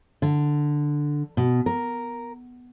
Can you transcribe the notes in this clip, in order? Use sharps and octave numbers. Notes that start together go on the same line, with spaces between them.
D3
B2
A#4